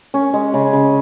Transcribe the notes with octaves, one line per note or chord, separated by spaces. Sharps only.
C#4
G#3
C#3
C#3